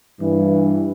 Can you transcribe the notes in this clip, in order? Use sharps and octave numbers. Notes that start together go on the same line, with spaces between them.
G2 E3